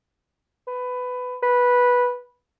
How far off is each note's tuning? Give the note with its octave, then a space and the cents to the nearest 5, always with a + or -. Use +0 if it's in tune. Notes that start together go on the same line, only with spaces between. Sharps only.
B4 +15
B4 -10